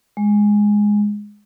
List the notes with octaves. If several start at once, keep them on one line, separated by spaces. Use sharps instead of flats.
G#3